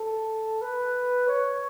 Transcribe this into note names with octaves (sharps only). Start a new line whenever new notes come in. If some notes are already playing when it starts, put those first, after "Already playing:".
Already playing: A4
B4
C#5